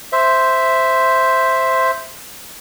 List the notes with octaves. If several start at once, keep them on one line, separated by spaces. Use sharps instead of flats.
C5 E5